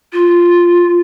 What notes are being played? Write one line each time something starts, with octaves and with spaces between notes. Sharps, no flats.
F4